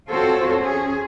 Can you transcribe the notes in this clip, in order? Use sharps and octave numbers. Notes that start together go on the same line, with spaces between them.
C4 F4 F#4 A4 C5 C#5
C#4 G#4